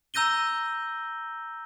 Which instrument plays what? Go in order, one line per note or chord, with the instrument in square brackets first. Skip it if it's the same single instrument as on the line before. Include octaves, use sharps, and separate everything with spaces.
[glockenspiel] A#5 E6 G6 A#6 D#7 G7